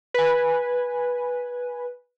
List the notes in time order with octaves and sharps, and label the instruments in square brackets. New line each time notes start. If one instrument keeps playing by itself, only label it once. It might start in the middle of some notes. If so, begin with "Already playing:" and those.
[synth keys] B4 G#5